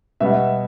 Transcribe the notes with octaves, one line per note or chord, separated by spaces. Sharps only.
B2 G3 B3 E5